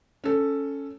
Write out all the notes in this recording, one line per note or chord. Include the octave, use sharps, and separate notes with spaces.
C#4 A4